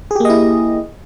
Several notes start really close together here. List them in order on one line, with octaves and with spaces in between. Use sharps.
G#4 G4 A#3 D#5 E4